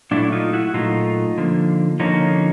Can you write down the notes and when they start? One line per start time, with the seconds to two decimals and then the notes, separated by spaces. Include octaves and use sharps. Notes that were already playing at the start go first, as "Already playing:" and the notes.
0.11 A#2 F#3 A3 D4 E4
0.32 D#4 F4
0.53 E4 F#4
0.74 A#2 F#3 A3 D#4 F4
1.38 D3 F3 A#3
2.00 D3 F3 A#3 C#4 D#4